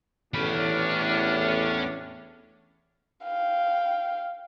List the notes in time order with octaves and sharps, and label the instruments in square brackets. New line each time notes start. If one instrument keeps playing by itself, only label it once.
[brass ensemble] A1 A2 [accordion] E2 D6 F6 [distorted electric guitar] C#4 B5 [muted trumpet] D4
[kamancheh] F5 G5